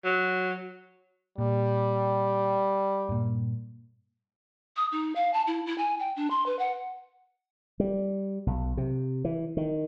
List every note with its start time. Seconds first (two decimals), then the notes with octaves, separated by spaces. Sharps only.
0.04 F#3
1.38 A#2 G3
3.09 G2 A#2
4.76 D#6
4.92 D#4
5.15 F5
5.33 A5
5.47 E4
5.66 E4
5.78 G#5
5.99 G5
6.16 D4
6.30 C6
6.46 B4
6.59 F#5
7.80 G3
8.47 B1
8.77 C3
9.25 E3
9.57 D#3